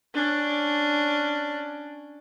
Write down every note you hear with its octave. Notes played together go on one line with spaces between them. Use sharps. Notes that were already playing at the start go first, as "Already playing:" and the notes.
C#4 D4